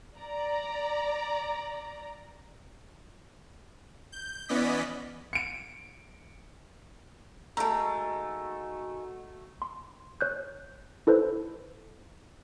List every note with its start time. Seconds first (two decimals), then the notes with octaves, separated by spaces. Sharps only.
0.18 D5 A#5
4.12 G6
4.49 E3 B3 C#4 D5 D#5 B6
5.33 C#7 D7
7.57 D#3 G#3 A3 F#4 A4 A#5
9.62 C6
10.21 C#5 F#6 G6
11.07 E4 A4 B4 C5